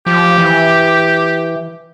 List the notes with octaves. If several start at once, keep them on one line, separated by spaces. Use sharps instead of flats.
F3 G4
E3